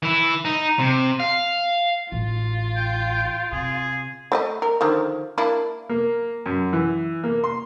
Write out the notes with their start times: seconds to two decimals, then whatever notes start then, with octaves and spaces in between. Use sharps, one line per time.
0.03 E3 E4
0.45 D#4
0.79 C3
1.20 F5
2.12 A1 F4
2.76 G5
3.52 C3 G#4
4.32 A3 D5 D#5
4.62 A#4
4.81 D3 D#3 F3
5.38 A#3 D4 E4
5.89 A#3
6.46 F#2
6.73 E3
7.24 A#3
7.44 C6